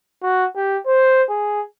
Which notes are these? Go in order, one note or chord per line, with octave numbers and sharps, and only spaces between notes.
F#4
G4
C5
G#4